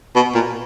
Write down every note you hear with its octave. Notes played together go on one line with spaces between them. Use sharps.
B2
A#2